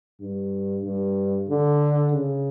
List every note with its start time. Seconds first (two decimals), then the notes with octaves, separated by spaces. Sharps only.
0.20 G2
0.83 G2
1.48 D3
2.12 C#3